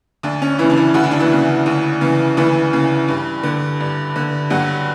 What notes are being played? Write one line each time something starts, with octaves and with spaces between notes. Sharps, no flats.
D2 D4
C#4
C#3 E3 E4
D4
E3 E4
D2 F#4
E4
D4
E3 E4
C#3 E3
D2
C#3 E3
D2 E3 E4
C#3 E3
G2
D3
G2
D3
G2 F#3 F#4